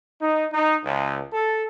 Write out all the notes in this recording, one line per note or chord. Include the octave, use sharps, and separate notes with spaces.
D#4
D#4
C#2
A4